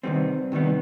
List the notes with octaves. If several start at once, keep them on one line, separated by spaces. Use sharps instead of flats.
C3 D#3 G3 B3 C4
C3 D#3 G3 B3